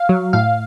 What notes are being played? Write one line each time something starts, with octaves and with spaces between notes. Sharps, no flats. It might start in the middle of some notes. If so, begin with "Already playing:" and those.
Already playing: F5
F#3
A2 F5